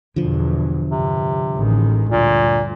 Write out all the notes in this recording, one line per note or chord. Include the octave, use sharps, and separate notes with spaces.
E2 G2 B2 D3 F3
G2 C3
A1 D#3 G#3
D2 G2 A#2